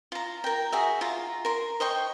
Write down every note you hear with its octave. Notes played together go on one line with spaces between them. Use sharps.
F4 A#5
A#4 G5
F#4 G#4 E5
F4 A#5
A#4 C6
C5 D#5 G5 C#6